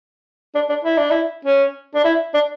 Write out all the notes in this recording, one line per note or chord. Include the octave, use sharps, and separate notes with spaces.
D4
D4
E4
D4
E4
C#4
D4
E4
D4